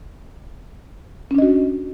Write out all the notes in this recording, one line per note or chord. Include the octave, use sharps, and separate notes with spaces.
C#4 D4 F#4 D#5